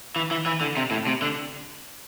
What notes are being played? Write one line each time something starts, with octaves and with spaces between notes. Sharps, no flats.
E3
E3
E3
D3
C3
A2
C3
D3